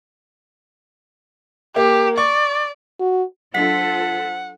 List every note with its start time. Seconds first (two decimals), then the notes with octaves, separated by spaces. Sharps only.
1.76 A#3 G4
2.17 D5 C#6
3.00 F#4
3.55 F#3 D4 F4 A4 C5 F#5 B6